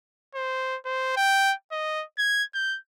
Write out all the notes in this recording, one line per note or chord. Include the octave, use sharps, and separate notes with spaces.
C5
C5
G5
D#5
G#6
G6